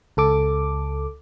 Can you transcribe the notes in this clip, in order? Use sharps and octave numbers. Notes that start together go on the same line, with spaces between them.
C#2 A4 D6